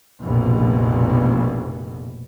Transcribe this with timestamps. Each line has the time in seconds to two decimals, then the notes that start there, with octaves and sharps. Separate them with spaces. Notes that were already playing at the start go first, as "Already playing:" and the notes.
0.21 F1 A#1 B2